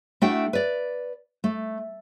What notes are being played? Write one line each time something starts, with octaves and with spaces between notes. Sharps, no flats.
A3 D4 E4 F#4 A4 G5
B4 D5
A3